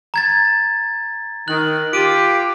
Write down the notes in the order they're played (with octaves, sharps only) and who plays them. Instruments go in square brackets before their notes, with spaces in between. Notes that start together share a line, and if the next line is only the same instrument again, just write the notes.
[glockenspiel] A#5 G#6 A6
[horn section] D#3 [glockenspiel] F#6 F#7
[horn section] F4 G4 [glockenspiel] D7 D#7